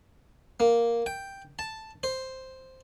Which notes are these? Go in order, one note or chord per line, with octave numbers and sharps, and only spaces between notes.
A#3
G5
A5
C5